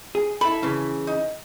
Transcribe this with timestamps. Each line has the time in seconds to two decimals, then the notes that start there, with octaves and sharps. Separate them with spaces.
0.15 G#4
0.41 E4 A4 A5 B5
0.63 C#3 E3
1.07 D#4